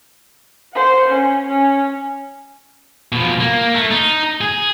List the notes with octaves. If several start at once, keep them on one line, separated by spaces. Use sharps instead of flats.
C5 F#5
C#4
C#4
B2 F3
A#3
A3
D#4
G#4